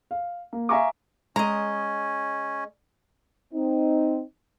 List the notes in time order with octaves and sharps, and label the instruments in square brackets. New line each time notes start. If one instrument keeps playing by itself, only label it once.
[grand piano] F5
A#3
E5 F5 G#5 A#5 C#6 D6
[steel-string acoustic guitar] G#3 D#5 [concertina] C#4 [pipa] A#5
[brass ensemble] C4 D#4